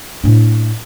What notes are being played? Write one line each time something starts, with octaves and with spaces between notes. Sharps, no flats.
A2 D4